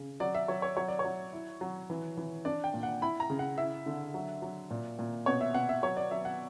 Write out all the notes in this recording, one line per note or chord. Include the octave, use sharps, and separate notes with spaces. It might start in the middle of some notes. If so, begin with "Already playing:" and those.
Already playing: C#3
F#3 D5
E5
F#3 C#5
C#5
F#3 C#5
D5
C#5
F#3
E4
F#3
E3
E3
D4 D5
G5
A#2
F#5
E4 B5
A#5
C#3
F#5
E4 E5
D3
F#3
F#3
A#2
A#2
B2 C#5
E5
B2 F#5
E5
F#3 C#5
D5
F#3 E5
F#5